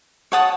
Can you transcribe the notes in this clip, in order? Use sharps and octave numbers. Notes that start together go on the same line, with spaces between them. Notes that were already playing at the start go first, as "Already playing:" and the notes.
C#5 F#5 A5 D#6